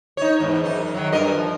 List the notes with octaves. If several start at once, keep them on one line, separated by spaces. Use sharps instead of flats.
D#4 C#5
E2 G#2
F#2 D#4
D#3 F#3
G2 A#4 D#5
F3